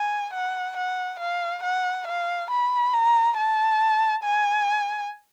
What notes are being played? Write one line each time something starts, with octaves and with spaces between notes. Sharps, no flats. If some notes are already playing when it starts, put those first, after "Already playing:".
Already playing: G#5
F#5
F#5
F5
F#5
F5
B5
A#5
A5
G#5